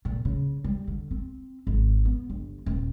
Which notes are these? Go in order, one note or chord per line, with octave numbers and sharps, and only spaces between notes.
A#2
C#3
G3
D3
C4
G#1
B3
G1
D#1